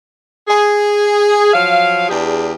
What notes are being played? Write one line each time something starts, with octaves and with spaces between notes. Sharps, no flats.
G#4
F3 F#3 F5
E2 D4 G4 G#4